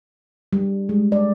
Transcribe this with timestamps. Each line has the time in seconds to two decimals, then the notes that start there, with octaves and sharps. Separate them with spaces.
0.53 G3
0.89 G#3
1.12 D5